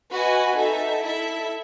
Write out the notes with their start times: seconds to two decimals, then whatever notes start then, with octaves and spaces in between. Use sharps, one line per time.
0.12 F#4 B4 D#5 G#5
0.57 D#4 A4 E5
1.02 E4 A4 E5